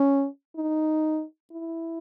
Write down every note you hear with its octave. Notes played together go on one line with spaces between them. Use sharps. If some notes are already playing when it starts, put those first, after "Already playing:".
Already playing: C#4
D#4
E4